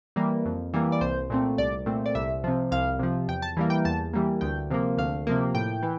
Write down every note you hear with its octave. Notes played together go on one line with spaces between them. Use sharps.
E3 G3 A#3
F2
E3 G3 A#3
D5
C2 C5
A#2 A3 C4
C2 D5
A#2 A3 C4
D5
C2 E5
C3 F3
C2 F5
C3 F3
E2 G5
A5
E3 G3 A#3
G5
E2 A5
E3 G3 A#3
D2 G5
C3 F3 A#3
D2 F5
C3 F3 A#3
A2 G5
E3